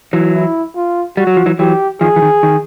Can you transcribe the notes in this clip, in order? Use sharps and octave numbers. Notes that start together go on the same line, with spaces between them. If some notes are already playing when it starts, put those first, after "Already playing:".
E3 F#3
E4
F4
G3 F#4
F#3
F3
E3 F#3
E3 F#3 G4
D#3 F3 G#4
E3
D#3
D#3